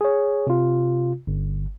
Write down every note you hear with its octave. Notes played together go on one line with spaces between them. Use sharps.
G#4 C#5
C3 F4
G1